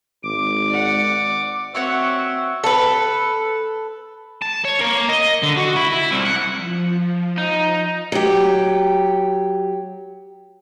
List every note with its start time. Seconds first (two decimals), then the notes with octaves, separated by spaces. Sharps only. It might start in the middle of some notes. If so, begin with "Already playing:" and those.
0.23 G#1 D6
0.69 D5 F#5
1.75 C4 F#4 C#5 E5 F#5
2.64 A4 B4
4.42 A5
4.65 C#5
4.80 A#3
5.09 D#5
5.43 D3
5.57 F#4
5.76 E4
5.92 E4
6.11 C2
6.25 F#5
6.56 F3
7.37 D#4
8.12 F#3 G4